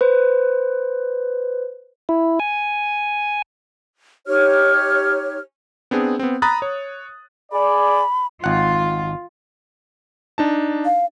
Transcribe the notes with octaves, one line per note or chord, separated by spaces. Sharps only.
B4 C5
E4
G#5
D#4 G4 C#5 F6
B3 C4 D4 G#4
B3 C4
A#5 B5 D#6 F#6 A6
C#5
G#4 D5 B5
G#1 F4 F#5
D4 D#4 A5
F5